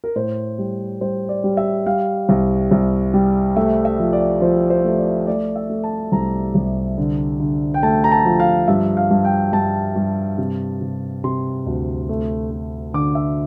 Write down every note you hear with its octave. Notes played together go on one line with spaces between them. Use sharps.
A#4
A2 C5
G3
G3 C5
D5
G3
E5
G3 F5
C2
C2
G3
A3 E5
E5
F3
D5
F3 C5
C5
A3
D5
A3 D5
E5
A3
A5
C2 A#5
C2
D3
D3
G5
A3 A5
A#5
A5
F3
F5
G2 E5
F5
G2
G5
G2 A5
G2
C3
C3
C3 C6
D2
A3
A3
D3 D6
E5